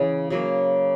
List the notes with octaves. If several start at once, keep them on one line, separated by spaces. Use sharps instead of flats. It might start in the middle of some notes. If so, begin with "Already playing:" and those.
Already playing: C#3 E3 G#3
C#3 F#3 A#3